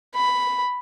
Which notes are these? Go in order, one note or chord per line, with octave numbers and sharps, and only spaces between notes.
B5